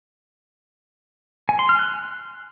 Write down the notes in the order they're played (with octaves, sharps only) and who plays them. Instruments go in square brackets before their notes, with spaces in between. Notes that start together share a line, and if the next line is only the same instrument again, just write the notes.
[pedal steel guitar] G#5
C6
F6
F#6